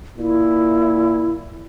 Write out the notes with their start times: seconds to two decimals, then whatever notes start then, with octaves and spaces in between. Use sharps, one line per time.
0.17 A#2 E4